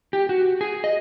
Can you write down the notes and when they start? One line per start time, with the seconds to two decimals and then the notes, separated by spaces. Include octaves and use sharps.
0.13 G4
0.29 F#4
0.61 G#4
0.84 D#5